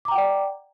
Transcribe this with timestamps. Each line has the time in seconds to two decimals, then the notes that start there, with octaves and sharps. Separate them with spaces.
0.05 D6
0.08 A#5
0.11 G5
0.15 F#5
0.18 D5